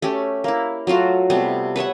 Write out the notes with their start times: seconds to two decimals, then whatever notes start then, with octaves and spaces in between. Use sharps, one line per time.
0.02 A3 C#4 G4
0.44 A#3 E4
0.87 F#3 A3 F4 F#4
1.30 C3 G3 A3 B3
1.76 B4 C#5 E5 F#5